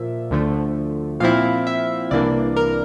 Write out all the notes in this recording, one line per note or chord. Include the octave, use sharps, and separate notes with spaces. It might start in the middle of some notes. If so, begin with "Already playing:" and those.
Already playing: A#2 F3 A#3 E5
D2 D3 F3 A3
A#2 F3 C4 E4 F5
E5
C2 C3 E3 A#3 D4 D5
A#4